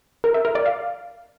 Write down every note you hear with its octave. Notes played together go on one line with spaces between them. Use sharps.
A#4
E5
A#4
D5
F5